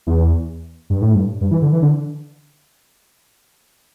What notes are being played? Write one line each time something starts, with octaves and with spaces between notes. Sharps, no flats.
E2
G2
A2
G2
G2
E3
D3
E3
D3